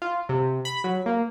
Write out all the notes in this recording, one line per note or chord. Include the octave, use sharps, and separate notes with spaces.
F4
C3
B5
F#3
A#3